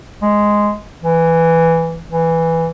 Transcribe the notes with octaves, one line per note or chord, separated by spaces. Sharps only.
G#3
E3
E3